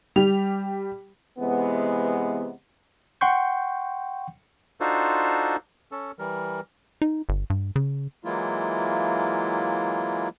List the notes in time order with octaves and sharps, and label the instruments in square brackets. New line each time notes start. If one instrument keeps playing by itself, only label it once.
[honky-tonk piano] G3 G4 F7
[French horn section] C3 E3 G#3 B3
[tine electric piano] F#5 G5 C6 C#6 G6
[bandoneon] D4 D#4 F4 F#4 A4 C5
C#4 A4
E3 G3 A#4
[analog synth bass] D#4
G1
G2
C#3
[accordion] E3 F#3 G#3 A#3 E4 F4